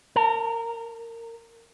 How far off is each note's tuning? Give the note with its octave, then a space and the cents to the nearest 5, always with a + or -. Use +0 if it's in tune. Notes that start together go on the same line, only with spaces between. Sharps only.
A#4 -20 A5 +20